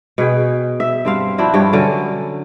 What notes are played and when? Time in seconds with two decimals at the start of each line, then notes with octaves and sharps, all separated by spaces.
0.18 B2 G#4 G5
0.80 E5
1.05 G2 C4 F5
1.38 F3 D4 E4 F#4
1.54 G2 G4 C#5 G5
1.73 D3 F#3 C#4